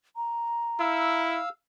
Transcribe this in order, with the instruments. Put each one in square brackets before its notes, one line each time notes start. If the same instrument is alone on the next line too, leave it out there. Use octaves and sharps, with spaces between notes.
[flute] A#5
[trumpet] E4 [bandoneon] F5 E6